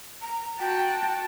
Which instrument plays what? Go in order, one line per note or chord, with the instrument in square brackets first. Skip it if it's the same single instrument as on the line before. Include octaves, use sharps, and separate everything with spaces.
[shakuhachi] A#5
[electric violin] F#4 A5 [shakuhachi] G5